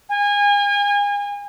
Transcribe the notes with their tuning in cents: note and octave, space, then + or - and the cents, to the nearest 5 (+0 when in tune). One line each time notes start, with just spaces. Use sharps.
G#5 -30